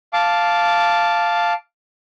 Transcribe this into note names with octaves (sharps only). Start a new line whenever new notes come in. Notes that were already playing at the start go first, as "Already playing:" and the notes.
F5 A5 D6